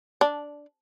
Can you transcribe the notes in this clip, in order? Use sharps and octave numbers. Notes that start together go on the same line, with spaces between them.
D4